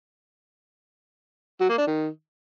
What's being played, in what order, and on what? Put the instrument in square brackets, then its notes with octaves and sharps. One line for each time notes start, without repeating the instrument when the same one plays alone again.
[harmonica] F#3
A#3
D4
D#3